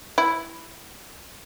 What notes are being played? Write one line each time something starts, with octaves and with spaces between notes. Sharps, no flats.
E4